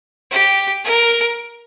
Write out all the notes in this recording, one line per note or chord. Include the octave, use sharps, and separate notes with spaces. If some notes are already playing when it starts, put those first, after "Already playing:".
G4
A#4